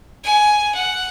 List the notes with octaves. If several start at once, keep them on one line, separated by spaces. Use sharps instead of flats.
G#5
F#5